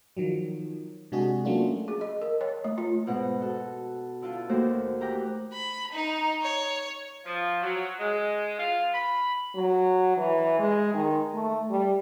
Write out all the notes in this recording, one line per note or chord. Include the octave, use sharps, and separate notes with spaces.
D#3 F3 F#3
C3 G#3 D4 F#4 G#4
F#3 A3 A#3 C#4 D4 F4
G#4
D#5
A#4
C#5
A3
F4
G#2 B2 F#5 F#6
F#4 A4
D3 E4 F4 A5
D#2 A3 A#3 F#4 A4 C5
E3 G4 A#5 D6 F#6
B5
D#4
C#5
F3
F#3
G#3
F4
B5
F#3
E3
G#3
D#3
A3
G3